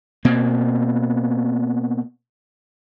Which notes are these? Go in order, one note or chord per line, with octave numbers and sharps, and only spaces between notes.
B2 A#3 C4